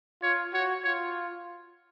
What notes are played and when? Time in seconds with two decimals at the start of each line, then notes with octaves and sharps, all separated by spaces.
0.23 F4 C#5
0.53 F#4 C#5
0.84 F4 C#5